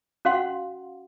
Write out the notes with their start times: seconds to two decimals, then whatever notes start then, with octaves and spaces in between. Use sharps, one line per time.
0.25 C#4 F#4 F5 F#5 C6